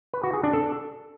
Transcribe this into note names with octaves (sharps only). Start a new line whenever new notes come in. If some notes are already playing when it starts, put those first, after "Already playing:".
B4
F#4
G#4
D4
A4